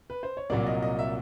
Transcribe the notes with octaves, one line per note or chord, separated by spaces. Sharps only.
B4
C5
C#5
C2 A#2 F#3 A#3 D5
D#5
D#5
E5